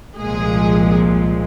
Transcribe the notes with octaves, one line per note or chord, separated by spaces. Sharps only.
C2 A#2 F3 G#3 G#4